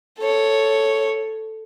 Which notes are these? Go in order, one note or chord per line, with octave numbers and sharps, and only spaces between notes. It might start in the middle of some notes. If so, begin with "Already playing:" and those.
A4 C#5